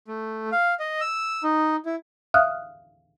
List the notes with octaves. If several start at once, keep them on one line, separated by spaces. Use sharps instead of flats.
A3
F5
D#5
E6
D#4
E4
E5 F5 D#6 F6 F#6